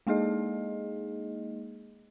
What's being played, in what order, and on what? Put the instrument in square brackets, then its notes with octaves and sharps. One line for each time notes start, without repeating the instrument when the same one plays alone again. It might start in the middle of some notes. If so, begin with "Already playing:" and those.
[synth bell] G#3 A#3 D#4 G#4 D#5